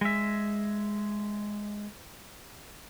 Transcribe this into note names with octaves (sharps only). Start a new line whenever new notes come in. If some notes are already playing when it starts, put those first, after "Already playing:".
G#3 E5